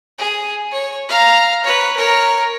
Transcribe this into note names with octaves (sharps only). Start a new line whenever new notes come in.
G#4
C#5
F5 A#5
B4 C#5
A#4 C#5